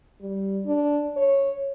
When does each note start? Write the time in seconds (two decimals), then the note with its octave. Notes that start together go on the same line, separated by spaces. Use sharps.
0.21 G3
0.66 D4
1.16 C#5